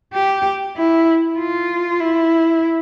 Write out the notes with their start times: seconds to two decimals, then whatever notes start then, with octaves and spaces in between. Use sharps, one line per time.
0.14 G4
0.76 E4
1.38 F4
2.00 E4